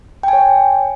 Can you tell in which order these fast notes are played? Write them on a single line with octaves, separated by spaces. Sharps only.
G5 G#5 C#5